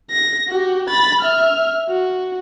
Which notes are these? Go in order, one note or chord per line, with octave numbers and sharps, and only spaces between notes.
A#6
F#4 G4
B5 A6
E5 F6
F#4